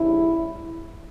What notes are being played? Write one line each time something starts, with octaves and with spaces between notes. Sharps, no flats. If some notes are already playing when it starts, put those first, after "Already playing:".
Already playing: E2 C#3 G3 D4 E4